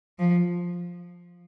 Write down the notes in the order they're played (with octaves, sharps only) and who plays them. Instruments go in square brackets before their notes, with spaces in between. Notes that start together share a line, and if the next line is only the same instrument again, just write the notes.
[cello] F3